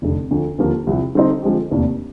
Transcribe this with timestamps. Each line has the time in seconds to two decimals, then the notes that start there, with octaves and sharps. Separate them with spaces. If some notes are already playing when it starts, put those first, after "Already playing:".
0.02 F1 F2 D3
0.31 D2 D3 F3
0.58 D#2 D3 F3 A#3
0.87 C2 C3 F3
1.15 D3 G3 C4 D#4
1.42 D3 F3 G#3 C4 G4
1.71 F1 D#2 D#3 A#3 D4